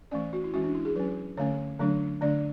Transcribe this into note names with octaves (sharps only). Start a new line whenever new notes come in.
E3 A3 C#4 D5
F#4
E4
E3 G#3 C#4 F#4
D4
E4
G#4
F#3 C#4 B4
D3 A3 C#4 C#5
D3 F#3 A3 D4
D3 A3 D4 D5